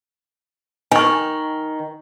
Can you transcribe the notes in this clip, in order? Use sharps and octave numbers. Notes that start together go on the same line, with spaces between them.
D#3 G#5 C#6